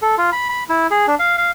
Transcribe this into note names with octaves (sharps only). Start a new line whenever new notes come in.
A4
F4
B5
B5
E4
G#4
D4
F5
F5